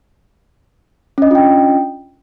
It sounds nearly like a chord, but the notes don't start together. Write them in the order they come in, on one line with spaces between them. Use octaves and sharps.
C#4 D#5 D4 F4 G5